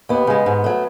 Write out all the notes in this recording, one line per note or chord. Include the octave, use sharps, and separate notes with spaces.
D#2 B3
C#3 G#3
G#2
F#3 A3